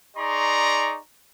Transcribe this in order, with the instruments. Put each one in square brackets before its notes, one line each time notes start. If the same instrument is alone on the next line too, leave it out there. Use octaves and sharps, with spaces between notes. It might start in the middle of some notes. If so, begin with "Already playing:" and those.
[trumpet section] D#4 G#4 D5 A#5 C6 C#6